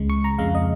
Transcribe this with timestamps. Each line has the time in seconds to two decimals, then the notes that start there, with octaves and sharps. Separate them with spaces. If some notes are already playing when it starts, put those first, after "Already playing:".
Already playing: C#2 C#3 G#3
0.10 C#6
0.24 A#5
0.38 F2 C#3 G#3 F5
0.55 D#5